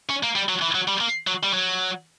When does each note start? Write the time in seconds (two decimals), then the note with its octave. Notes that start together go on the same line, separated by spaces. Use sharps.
0.10 C#4
0.23 A#3
0.36 G3
0.49 F#3
0.62 E3
0.75 F#3
0.88 G3
1.01 A#3
1.27 F#3
1.43 G3
1.53 F#3